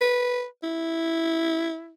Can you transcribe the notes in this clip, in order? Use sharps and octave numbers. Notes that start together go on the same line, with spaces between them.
B4
E4